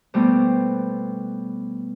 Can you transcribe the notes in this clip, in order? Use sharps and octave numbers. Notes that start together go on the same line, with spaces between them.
B2 G3 A3 B3 C4